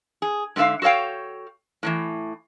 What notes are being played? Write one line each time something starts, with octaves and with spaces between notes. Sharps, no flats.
G#4
G#2 D3 F#3 E5 F5
F#4 A4 C#5 F5 G5
A2 D#3 E3